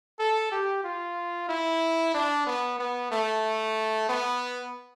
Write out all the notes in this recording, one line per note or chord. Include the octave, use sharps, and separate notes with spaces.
A4
G4
F4
E4
D4
B3
B3
A3
B3